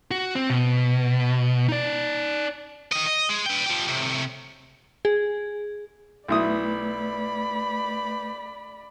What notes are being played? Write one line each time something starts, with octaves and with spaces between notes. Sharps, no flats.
F#4
C4
B2
D#4 D5
D#3 D#5
D#5
G#3
B4 G5
F3 G4
A2 C3
G#4
B1 A3 E4 B4 D5 B5 D#6